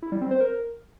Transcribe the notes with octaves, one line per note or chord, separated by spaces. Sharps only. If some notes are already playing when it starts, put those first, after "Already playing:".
E4
G3
C4
C5
A#4